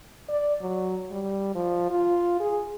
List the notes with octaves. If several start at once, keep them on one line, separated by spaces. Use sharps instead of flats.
D5
F#3
G3
F3
F4
G#4